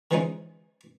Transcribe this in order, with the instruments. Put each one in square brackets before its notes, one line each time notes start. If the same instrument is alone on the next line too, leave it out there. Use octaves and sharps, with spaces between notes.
[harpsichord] D3 E3 F3 G#3 C#4 D#4